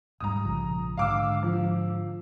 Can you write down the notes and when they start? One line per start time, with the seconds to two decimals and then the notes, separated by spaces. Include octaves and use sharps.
0.20 D#1 G#2 G3 A#5 D#6
0.45 A#1 C#3 F3
0.97 G#2 D3 F5 D6 E6
1.43 F3